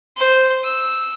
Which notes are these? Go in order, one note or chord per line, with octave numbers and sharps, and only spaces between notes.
C5
E6